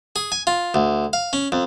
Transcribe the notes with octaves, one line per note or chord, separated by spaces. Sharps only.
G#4
G#5
F4
D2
F5
C#4
F2